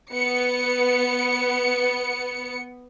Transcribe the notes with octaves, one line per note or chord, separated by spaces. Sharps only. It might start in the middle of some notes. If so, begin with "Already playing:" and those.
B3 C#7